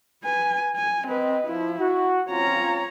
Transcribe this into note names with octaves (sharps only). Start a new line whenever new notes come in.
B4 G#5
G#5
C4 B4 D#5
F3 E4
F#4
C4 C#4 F4 C#5 A#5